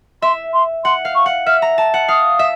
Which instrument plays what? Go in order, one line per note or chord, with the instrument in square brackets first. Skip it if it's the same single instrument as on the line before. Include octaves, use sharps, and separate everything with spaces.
[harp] E5 [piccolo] C6
[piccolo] C6
[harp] F#5 [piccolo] C6
[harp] F5
[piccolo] C#6
[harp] F#5
[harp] E5 [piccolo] F6
[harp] A#5
A5
F#5
[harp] F5 [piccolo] D#6
[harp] E5